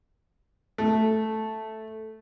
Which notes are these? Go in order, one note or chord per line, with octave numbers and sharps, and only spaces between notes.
A3